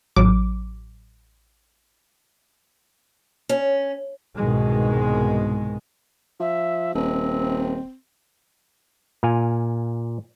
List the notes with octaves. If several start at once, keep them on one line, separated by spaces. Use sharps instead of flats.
A1 F#3 D6
C#4
C2 G#2 B2 D#3 G#3
F3 E5
D#1 C4 D#5
A#2 F5 G#5